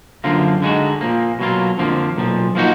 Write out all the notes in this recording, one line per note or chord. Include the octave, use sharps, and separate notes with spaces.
F#2 D3 F3 A#3 F4
D3 G#3 D#4 F#4
A#2 F3 A#3
B2 F#3 A#3 F4
F2 D3 F3 A#3
B1 A#2 F3
F3 A#3 D#4 F#4